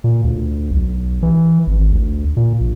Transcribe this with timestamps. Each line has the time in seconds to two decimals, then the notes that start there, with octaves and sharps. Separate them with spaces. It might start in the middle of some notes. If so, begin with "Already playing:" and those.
0.04 A#2
0.24 D2
0.71 B1
1.23 E3
1.67 G#1
1.92 D2
2.37 A#2
2.60 A#1